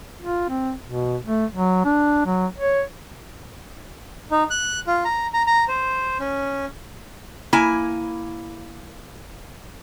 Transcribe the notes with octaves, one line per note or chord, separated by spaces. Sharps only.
F4
C4
B2
A3
F#3
D4
F#3
C#5
D#4
F#6
F4
A#5
A#5
A#5
C5
C#4
A#3 E4 G#5